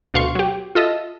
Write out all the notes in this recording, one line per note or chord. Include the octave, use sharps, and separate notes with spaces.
D2 B2 F5 C6 C#6
F#3 G4
F4 A4 D#5 E5